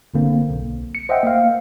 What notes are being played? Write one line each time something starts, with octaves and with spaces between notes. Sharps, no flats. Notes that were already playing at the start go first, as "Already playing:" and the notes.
G1 D3 A#3 C4
B1
C#7
C5 D#5 E5 F#5 G5
A#3 F5